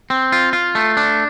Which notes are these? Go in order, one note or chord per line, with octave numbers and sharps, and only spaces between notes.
C4
F4
F4
A3
D4